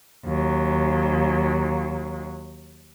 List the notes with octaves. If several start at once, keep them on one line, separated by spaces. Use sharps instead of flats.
D#2 F#3